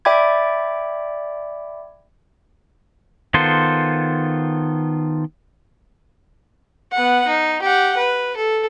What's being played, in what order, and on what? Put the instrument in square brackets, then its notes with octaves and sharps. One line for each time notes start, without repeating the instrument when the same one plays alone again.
[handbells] D5 E5 G5 B5 D6 G#6
[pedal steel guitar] D#3 B3 F4 A4 C5
[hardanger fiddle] B3 F#5
D#4
G4 F#5
B4
A4